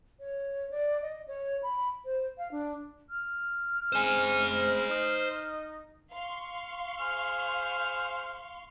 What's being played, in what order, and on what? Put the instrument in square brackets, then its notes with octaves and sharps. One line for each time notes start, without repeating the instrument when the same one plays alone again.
[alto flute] C#5
D5
D#5
C#5
B5
C5
F5
D4
[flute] F6
[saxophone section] C#3 G#3 C4 [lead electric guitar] C5 G#5
[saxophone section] D#4 D#5
[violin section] F5 C6 C#6
[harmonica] G#4 C5 F6